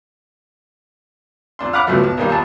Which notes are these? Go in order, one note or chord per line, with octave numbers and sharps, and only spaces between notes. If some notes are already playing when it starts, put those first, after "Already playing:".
F2 D4 C6
F5 F#5 B5 D6 F#6
C#2 G2 B2 F3 F#3 A3
B1
A#1 D#3 G3 A#3
A#1 A#3 A5